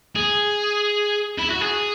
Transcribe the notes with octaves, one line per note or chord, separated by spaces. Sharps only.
G#4
E4
F#4
G#4